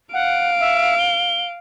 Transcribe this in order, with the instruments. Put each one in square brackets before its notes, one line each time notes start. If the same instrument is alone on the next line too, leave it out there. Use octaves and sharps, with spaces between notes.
[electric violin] F5 D7 [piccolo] F#5
[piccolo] E5
G7